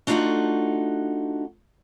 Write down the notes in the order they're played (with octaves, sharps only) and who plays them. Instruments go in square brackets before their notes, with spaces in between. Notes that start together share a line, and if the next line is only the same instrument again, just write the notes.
[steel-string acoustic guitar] A3 D4 D#4 F4 F#4 F#5